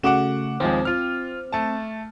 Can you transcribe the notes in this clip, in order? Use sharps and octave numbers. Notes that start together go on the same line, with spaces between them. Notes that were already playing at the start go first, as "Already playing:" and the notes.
C#3 A3 F#4 F#5 D6 E7
D#2 F3 G#3 C4
F4 F6
A3 A5